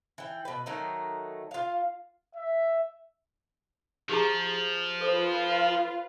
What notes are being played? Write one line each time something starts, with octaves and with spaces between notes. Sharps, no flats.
E3 G5
B2 B4
D#3 F#3 A3 D#4
F4 F5
E5
F3 G4 G#4 A#5
F4 A4 B4 C5